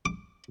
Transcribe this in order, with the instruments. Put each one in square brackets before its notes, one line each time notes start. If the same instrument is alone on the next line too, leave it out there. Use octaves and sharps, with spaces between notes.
[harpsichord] D6